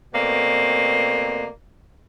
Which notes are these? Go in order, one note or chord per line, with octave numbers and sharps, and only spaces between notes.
B2 A3 A#3 C4 D5